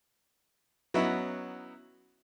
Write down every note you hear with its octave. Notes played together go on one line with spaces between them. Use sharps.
F#3 B3 C#4 D#4 E4 E5